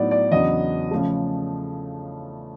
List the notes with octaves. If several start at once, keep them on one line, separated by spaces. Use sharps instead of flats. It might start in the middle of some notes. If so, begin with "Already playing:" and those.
Already playing: A2 F#3 B3 D#4 D5
D5
E2 C#3 F#3 B3 D4 D#5
C#3 F3 A3